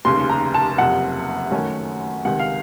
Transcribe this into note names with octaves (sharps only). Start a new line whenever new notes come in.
F1 D#2 C#3 C6
A#5
A5
F#1 F2 C3 F#5
F#2 D#3 A3 C#4
C#2 C3 D#3 F#5
F5